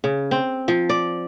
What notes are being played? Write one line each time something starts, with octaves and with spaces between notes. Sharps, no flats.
C#3
C4
F3
D5